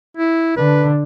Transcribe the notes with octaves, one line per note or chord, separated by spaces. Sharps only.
E4
D3 B4